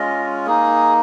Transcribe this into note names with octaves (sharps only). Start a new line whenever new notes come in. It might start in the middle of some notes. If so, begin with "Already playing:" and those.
Already playing: G#3 C#4 F4 D#5
A#3 D#4 G#4